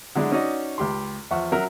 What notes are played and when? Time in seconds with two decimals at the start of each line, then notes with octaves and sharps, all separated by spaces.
0.15 D3 F#3 G#3 D4 E4
0.32 C#4 D#4 F#4 D5 D#5
0.78 C#2 G4 C6
1.31 E2 F3 E5 F#5 C#6
1.52 F#3 C#4 A#4 E5